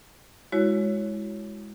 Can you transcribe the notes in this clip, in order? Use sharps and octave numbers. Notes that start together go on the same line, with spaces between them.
G#3 E4 F#4 C#5